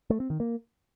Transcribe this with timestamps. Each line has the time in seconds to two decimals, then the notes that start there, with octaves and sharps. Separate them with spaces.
0.10 A3
0.20 C4
0.30 D#3
0.40 A#3